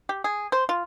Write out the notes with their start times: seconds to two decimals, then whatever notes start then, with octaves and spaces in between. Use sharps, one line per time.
0.09 G4
0.24 G#4
0.52 C5
0.69 F4